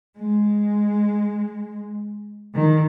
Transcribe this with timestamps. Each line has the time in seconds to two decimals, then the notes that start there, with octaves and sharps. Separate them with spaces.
0.18 G#3
2.54 D#3